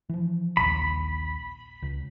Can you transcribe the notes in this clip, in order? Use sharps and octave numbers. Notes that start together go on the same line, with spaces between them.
E3 F3
A#1 D#2 B5
C#2